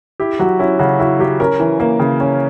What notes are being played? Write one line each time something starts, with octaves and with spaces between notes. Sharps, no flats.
E4 G4
F#3 F#4
C#4 E4
C#3 F#4
E4 F#4
F#3 G4
C#4 A#4
E3
A#3
C#3
C#4